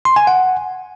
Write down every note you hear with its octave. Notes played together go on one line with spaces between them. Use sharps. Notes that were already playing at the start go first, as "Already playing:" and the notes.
C6
G#5
F#5